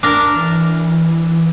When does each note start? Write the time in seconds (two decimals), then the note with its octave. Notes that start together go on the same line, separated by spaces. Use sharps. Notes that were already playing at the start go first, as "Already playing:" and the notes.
0.03 D4 A#4
0.36 E3